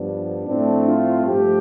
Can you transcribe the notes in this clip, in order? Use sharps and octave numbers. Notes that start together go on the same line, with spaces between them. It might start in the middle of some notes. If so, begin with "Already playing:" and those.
Already playing: G2 F3 B3 D4
A2 F3 A3 C4 D4
F4
G2 F3 A3 G4